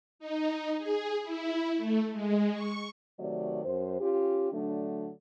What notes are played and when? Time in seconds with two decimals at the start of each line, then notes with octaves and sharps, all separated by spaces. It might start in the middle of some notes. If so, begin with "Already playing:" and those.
0.19 D#4
0.78 G#4
1.23 E4
1.76 A3
2.12 G#3
2.53 C#6
3.19 C3 D#3 F#3 A3 D5
3.65 F#2 C5
3.99 C#4 F4 G4
4.52 D3 F#3 A3 D4